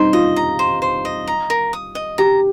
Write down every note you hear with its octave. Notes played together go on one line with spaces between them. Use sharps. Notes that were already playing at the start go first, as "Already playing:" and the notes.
Already playing: G3 C4 D#4 C5
F4 D#5
A#5
C5
C5
D#5
A#5
A#4
D#6
D#5
G4 A#5